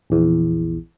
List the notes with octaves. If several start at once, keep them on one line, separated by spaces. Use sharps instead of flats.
A#1 E2